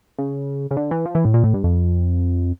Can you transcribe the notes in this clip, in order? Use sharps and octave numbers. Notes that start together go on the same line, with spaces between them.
C#3
C#3
D3
E3
F3
E3
A2
A#2
A2
G2
F2